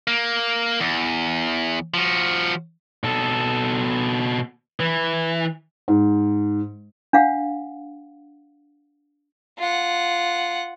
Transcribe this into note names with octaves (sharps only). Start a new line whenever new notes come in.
A#3
E2
F3 F#4
B2 A4
E3
G#2
D4 F5 F#5
F4 F#5